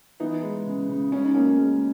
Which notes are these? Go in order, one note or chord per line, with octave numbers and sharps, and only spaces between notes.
E3 B3 D#4
G#3
C#3
C#3
G#3 C#4
D#4
B2 A#3 C#4
G#3